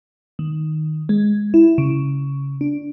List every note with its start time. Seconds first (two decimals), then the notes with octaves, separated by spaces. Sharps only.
0.39 D#3
1.09 G#3
1.54 E4
1.78 C#3
2.61 D4